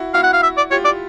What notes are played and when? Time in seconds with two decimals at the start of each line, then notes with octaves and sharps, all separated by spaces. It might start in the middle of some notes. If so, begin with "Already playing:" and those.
Already playing: E4 F#4
0.14 E4 F#4 F5
0.23 F#5
0.33 F5
0.43 E5
0.57 D5
0.71 F4 G4 C#5
0.85 D5